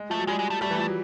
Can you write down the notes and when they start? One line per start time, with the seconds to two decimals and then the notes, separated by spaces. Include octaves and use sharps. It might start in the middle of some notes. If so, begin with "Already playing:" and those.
Already playing: G#3
0.10 F3 A3
0.19 F#3
0.27 G3 G#3
0.39 G#3
0.50 A3
0.61 G3 A3
0.71 E3
0.78 F3
0.88 F#3